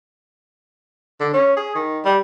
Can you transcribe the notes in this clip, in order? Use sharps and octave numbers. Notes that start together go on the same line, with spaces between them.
D3
C#4
G#4
D#3
G3